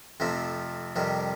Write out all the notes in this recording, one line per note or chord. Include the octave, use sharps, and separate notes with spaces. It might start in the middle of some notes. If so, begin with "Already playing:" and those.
F2 C3 F3 A3 C4
F2 C3 D#3 G3